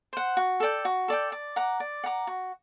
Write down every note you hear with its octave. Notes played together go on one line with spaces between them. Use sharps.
C5 F#5
F#4
A4 D5 G5
F#4
A4 D5 G5
D5
F#5 A#5 D6
D5
F#5 A#5 D6
F#4